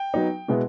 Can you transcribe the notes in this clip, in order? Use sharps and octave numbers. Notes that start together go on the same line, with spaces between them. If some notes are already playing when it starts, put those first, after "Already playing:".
Already playing: G5
F#3 B3 D#4
B2 G#3 B3 E4